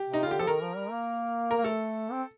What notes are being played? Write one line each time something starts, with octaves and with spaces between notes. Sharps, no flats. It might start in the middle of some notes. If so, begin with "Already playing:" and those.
Already playing: G4
C3 D#4
F4
D3 G4
F3 A4
D#3 A#4
F3
G3
A#3
A#4
A#3
A3 A4
C4